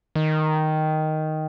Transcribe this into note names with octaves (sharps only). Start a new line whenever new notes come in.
D#3